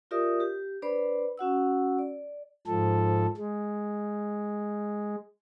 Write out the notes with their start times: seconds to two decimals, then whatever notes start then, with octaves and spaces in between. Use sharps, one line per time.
0.11 F4 G4 A#4 D5 E5 D#6
0.40 G4
0.82 D4 B4 C5 D5 B5
1.38 C#4 F#4 F#5 E6
1.99 D5
2.67 G#2 F3 A4
3.37 G#3